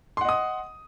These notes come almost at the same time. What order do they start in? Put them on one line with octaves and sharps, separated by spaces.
C6 F#5 D#5 D#6